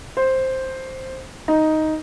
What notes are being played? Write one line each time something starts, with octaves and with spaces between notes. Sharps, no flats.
C5
D#4